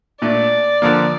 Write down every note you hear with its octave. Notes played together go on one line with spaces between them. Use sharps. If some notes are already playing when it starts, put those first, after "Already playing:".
A#2 A3 D4 D5
D3 F3 A#3